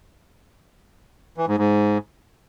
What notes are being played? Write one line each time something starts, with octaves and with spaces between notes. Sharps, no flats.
E3
G#2
G#2